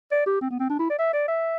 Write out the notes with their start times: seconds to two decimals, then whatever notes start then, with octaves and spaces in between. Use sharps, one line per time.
0.11 D5
0.26 G4
0.41 C4
0.51 B3
0.59 C4
0.69 D4
0.79 E4
0.90 D5
0.99 E5
1.13 D5
1.28 E5